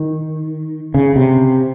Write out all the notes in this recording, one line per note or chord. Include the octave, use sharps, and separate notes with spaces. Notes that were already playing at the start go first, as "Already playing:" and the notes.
Already playing: D#3
C#3
C3